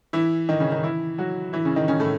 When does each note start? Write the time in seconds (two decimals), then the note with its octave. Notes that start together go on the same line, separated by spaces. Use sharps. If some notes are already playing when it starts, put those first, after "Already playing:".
0.13 E3 E4
0.49 D#3 D#4
0.60 C#3 C#4
0.72 D#3 D#4
0.83 E3 E4
1.18 F#3 F#4
1.53 E3 E4
1.65 C#3 C#4
1.76 D#3 D#4
1.88 C#3 C#4
2.00 A2 A3